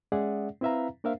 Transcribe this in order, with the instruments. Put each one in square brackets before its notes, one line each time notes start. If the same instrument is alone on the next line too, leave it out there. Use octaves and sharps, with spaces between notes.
[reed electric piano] G#3 C#4 G#4 D5 E5 F#5
C4 E4 B4 E5 F5 A#5
A#3 D4 A#4 C5 E5 F5